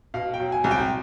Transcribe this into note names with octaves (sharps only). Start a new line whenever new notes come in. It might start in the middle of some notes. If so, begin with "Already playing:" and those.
B2 F5
G5
F#3
G#5
C2 G#5
G5